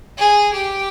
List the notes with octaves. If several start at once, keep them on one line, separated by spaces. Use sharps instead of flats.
G#4
G4